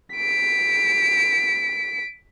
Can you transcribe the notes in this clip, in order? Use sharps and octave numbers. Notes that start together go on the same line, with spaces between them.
B6 D7